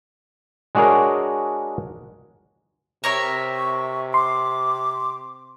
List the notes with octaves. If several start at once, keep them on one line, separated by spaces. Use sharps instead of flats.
G#3 D4 F#4 G#4 A#4 C#5
C3 A#4 C#5 E5
C#6
C6 D6